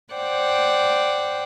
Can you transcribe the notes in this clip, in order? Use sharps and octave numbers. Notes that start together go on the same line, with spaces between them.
C5 D5 F#5 G5